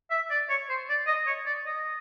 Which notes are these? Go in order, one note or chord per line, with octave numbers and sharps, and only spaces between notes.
E5
D5
C#5
C5
D5
D#5
C#5
D5
D#5